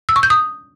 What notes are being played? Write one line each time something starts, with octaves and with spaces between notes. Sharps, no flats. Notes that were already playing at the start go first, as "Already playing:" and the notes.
E6
C#6
G6
D#6